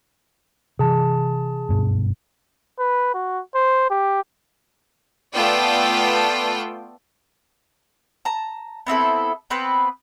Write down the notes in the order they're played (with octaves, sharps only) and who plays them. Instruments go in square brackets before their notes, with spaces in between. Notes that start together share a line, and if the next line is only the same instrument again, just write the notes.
[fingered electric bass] C3 E3 [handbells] G#4 A5
[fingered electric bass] F#1 G2 B2
[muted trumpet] B4
F#4
C5
G4
[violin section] A3 B3 F4 A4 D5 G5
[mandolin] A5 A#5
B3 C4 E4 A4
B3 C4 B4 G5